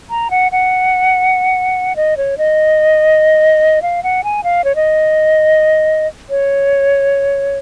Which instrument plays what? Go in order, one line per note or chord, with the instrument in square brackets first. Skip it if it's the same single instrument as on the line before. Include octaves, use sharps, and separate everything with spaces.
[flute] A#5
F#5
F#5
D#5
C#5
D#5
F5
F#5
G#5
F5
C#5
D#5
C#5